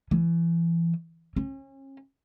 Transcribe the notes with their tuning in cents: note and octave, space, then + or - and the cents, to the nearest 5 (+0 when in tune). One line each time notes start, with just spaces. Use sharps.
E3 +30
C#4 -35